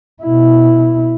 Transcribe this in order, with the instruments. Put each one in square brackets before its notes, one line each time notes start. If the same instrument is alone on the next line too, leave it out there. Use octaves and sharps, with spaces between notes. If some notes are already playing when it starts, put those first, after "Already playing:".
[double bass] B2 E4